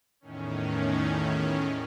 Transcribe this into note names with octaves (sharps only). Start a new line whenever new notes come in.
E2 A2 D#3 C#4